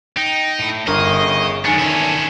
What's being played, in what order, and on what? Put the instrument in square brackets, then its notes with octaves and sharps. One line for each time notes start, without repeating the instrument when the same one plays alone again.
[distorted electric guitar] D#4 [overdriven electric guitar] G5
[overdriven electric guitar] A2 E4
[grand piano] G1 A#4 [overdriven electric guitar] C#4 G#4 [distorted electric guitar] D#5
[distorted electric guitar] F#2 D4 [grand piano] D#3 G#5 C#7 [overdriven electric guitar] A#4 C#5
[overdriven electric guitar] E2 D3 [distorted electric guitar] C#4 E4